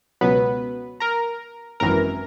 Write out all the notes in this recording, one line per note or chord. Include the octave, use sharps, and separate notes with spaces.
C#2 B2 F#3 B3 B4
A#4 A#5
G#1 F#2 E3 A#4 A#5